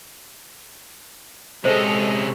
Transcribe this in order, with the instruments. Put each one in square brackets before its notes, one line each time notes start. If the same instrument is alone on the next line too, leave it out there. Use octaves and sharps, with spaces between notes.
[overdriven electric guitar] C3 C#4 [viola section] G#3 A4 D#5 [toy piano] C5